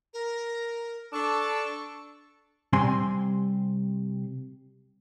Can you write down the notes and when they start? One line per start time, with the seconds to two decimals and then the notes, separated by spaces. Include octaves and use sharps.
0.13 A#4
1.13 D4 A4 C#6
2.73 C3 G3 C4 G#5 C6